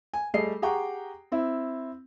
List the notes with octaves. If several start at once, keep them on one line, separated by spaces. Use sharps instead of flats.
G#5
G3 A3 G#4 D#5 C7
G4 G#4 F#5 G5 A#5 C#6
C4 E4